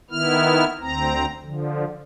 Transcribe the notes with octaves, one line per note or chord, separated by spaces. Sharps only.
D#3 B3 E4 F6
D2 C4 A#5
D3 F3